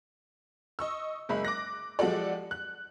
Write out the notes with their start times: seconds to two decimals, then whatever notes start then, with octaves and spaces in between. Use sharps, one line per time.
0.79 D#5 C#6 E6
1.29 F#1 G#3 E5 B5
1.45 D6 F#6 A#6
1.99 F3 G#3 F#4 G4 A4 D5
2.51 F#6